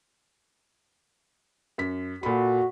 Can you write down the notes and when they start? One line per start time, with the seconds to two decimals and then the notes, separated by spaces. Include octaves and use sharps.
1.78 F#2 B6
2.23 A#2 F#4 A4 B5